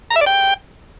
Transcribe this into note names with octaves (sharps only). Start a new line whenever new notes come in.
A#5
E5
D5
G5